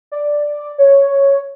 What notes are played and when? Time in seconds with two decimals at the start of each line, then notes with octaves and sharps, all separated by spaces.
0.12 D5
0.78 C#5